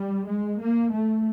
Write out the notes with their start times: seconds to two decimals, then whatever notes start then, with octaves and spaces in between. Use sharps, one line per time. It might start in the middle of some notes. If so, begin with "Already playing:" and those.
Already playing: G3
0.28 G#3
0.60 A#3
0.92 A3